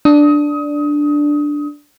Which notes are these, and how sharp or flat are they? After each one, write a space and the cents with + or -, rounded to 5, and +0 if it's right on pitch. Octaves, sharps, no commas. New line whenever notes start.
D4 +0 D#6 +25